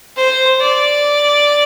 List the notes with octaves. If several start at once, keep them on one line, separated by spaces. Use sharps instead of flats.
C5
D5